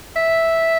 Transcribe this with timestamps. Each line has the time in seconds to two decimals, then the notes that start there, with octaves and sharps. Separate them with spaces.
0.16 E5